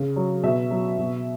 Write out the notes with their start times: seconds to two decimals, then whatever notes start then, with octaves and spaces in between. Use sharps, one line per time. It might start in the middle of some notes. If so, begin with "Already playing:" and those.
Already playing: C#3
0.16 F#3
0.43 B2 E5
0.71 F#3
0.98 B2